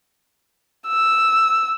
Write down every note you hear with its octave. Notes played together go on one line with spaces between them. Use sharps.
E6